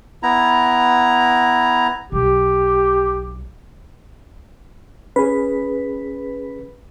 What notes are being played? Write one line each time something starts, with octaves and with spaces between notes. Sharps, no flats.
B3 E4 A#5
B1 G4
C#4 G#4 B4